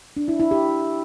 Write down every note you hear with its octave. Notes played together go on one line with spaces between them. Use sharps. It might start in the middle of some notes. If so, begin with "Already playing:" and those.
D4
E4
E4
G4